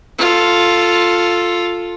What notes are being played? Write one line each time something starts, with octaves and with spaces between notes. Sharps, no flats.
F4 A4